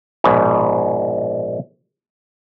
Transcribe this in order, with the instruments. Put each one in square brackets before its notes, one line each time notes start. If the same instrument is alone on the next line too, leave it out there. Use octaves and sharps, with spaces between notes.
[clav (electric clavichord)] A#1 G#2 B2